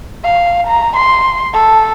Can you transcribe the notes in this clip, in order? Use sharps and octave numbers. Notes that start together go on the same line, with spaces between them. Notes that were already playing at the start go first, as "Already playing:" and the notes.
F5
A#5
C6
A4